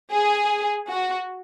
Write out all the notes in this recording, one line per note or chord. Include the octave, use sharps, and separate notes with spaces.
G#4
F#4